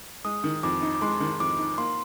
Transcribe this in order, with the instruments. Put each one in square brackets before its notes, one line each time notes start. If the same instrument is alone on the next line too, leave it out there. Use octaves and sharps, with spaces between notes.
[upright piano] G#3 [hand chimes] D#6
[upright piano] D#3
[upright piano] F2 [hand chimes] D6
[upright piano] D#4
[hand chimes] D6
[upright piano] G#3 [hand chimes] C6
[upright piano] D#3
[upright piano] F2 [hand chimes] D6
[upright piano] D#4
[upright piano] A#3 [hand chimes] C6